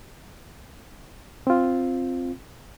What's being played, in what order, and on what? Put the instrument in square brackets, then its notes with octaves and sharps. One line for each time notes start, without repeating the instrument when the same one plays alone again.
[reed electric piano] C4 F4